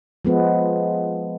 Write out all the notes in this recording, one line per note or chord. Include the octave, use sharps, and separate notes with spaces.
F3 G#3 B3